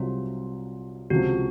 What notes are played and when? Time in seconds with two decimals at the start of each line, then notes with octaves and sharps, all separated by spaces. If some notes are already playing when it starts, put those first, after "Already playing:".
Already playing: C2 C3 F#3 F4
1.10 C#2 C3 F3 F#4